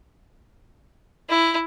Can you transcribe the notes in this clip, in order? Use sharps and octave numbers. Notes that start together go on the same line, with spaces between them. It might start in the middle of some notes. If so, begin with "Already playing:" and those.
E4